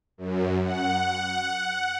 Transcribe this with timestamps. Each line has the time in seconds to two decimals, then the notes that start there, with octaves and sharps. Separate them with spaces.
0.18 F#2
0.63 F#5